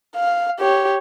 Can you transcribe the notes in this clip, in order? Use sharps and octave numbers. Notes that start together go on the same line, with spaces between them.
F5
G4 C#5